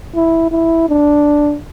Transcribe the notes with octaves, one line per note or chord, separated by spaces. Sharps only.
E4
E4
D4